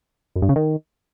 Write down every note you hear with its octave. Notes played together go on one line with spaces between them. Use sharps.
F#2
G2
C#3
D#3